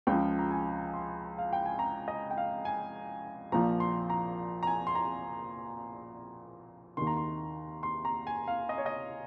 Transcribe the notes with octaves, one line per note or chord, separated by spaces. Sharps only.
C#2 C#3 F3 G5
A#5
G#5
C6
F5
G5
G#5
A#5
D#5
G5
F5
G#5
A#1 A#2 F3 A#5
C6
A#5
A#5
G#5
C6
A#5
D#2 D#3 C6
A#5
C6
C6
A#5
G#5
F5
D#5
C#5
D#5